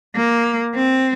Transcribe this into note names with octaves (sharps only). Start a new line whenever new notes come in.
A#3
C4